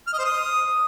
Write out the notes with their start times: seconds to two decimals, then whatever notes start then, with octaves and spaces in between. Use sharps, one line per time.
0.07 F6
0.13 D#5
0.19 C5
0.25 D#6